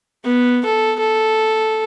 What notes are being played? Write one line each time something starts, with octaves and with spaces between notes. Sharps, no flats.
B3
A4
A4